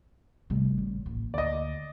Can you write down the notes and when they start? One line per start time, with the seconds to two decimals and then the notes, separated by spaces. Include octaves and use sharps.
0.50 G#1 C3 G3 A3
0.77 A1 C#3
1.06 A1 A#3
1.34 D2 D5 D#5